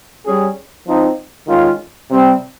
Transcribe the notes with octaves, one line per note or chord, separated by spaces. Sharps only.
G3 C#4 G#4
F3 C4 D#4
D#3 G#3 C#4 F4
C3 G3 C4